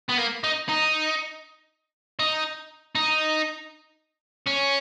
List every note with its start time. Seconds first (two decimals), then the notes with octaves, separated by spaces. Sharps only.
0.09 B3
0.18 A#3
0.44 D#4
0.69 D#4
2.20 D#4
2.95 D#4
4.46 C#4